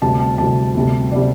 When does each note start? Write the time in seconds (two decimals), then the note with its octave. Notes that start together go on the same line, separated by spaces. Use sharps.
0.02 D2 C3 G3 A5
0.20 A5
0.38 D2 C3 G3 A5
0.75 D2 C3 G3
1.12 C3 G3 D5